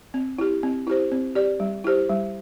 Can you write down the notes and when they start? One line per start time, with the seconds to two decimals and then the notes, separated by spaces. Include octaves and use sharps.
0.14 C4
0.38 E4 G4
0.63 C4
0.87 E4 G4 C5
1.12 C4
1.35 G4 D5
1.60 G3
1.84 E4 G4 C5
2.09 G3